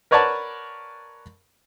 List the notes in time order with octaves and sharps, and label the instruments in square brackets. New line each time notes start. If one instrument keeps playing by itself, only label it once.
[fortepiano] A#4 B4 C#5 D5 F#5 A5